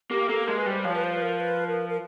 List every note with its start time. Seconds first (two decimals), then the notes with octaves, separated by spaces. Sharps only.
0.11 A#3 G4
0.29 A#3 A4
0.43 G#3 A#4
0.57 B4
0.66 G3 C5
0.85 F3 C#5
0.95 B4
1.04 C5
1.14 B4
1.22 A#4
1.40 B4
1.68 A#4
1.90 A#4